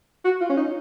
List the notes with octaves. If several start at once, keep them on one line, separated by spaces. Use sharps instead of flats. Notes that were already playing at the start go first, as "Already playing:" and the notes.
F#4
F4
C#4
D#4